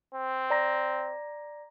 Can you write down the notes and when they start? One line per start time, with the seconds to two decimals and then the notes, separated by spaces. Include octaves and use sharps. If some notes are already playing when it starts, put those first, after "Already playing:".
0.15 C4
0.50 D5 A#5 A#6